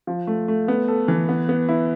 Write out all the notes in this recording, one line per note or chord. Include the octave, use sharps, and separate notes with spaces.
F3
A3
A3
B3
A4
E3
B3
B3
E4